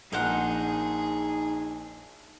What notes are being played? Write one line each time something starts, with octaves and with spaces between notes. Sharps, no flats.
A#1 D#4 G#4 A#4 C5 F#5